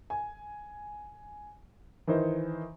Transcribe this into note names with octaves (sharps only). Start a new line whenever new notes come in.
G#5
D#3 E3 D#4 C5